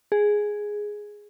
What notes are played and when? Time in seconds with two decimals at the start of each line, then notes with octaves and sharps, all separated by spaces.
0.12 G#4